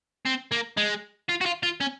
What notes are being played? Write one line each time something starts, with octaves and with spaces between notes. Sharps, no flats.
C4
A#3
G#3
F4
F#4
F4
F4
C#4